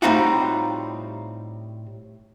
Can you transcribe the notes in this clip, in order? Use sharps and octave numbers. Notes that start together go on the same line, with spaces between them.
A2 G3 C4 D#4 F4 F#4